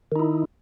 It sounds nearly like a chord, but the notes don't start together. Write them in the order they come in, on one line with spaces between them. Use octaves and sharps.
D#3 D#4 E4